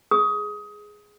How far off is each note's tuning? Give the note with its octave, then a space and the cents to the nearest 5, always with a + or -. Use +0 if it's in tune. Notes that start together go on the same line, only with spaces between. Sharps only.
G#4 +0 D#6 +20